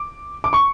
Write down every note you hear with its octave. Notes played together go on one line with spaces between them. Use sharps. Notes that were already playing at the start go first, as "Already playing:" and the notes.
Already playing: D6
D6
C#6